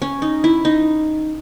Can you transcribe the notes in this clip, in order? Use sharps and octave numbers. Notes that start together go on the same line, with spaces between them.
C#4
D#4
E4
D#4